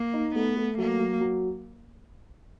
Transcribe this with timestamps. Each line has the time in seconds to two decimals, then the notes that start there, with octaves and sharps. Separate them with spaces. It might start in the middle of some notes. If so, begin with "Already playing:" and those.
Already playing: A#3
0.14 D#4
0.35 A3 B3
0.57 A3
0.78 F#3 A#3
0.99 F#3
1.20 F#3